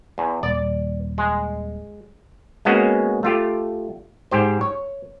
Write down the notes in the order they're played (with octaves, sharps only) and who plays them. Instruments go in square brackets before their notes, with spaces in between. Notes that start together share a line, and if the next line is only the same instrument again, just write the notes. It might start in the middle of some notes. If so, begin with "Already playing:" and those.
[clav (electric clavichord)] E2
[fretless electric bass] D#1 [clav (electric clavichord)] D5
[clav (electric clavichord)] G#3
G#3 A#3 B3 C#4 F#4 G#4
A3 F4 G4
G#2 G4 C5
C#5